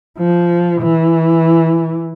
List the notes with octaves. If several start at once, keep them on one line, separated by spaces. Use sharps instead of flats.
F3
E3